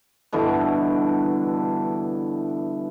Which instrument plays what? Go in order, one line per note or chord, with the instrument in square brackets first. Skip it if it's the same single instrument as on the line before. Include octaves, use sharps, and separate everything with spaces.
[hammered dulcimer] G2 B2 D3 E3